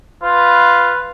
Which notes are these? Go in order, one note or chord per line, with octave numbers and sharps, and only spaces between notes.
F4 B4